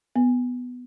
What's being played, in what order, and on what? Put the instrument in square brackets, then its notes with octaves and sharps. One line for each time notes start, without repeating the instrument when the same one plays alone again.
[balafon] B3